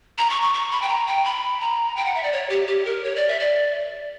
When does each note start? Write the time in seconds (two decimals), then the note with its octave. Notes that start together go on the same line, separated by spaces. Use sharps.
0.18 A#5
0.30 C#6
0.42 C#6
0.54 C#6
0.71 B5
0.82 G5
0.89 A#5
1.07 G5
1.25 B5
1.61 A#5
1.97 G5
2.05 F#5
2.15 E5
2.23 D5
2.32 C#5
2.50 G4
2.67 G4
2.85 A#4
3.04 C#5
3.16 D5
3.28 E5
3.40 D5